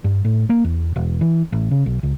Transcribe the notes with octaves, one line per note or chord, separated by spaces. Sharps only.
G2
A2
A#3
E2
E1
E3
A1
C#3
B1
C#2